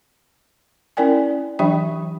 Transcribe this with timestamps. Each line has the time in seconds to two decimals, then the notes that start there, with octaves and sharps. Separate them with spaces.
0.97 C#4 E4 A#4 D5 G5 G#5
1.59 E3 F#3 D4 G4 E5 G5